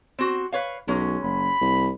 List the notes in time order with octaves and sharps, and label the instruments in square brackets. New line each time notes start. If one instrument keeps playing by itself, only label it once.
[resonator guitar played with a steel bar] C4 F#4
B4 C#5 F5
[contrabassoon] B1 [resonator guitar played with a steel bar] F#3 G#3 C#4
[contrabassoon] F#1 [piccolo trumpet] B5
[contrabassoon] C2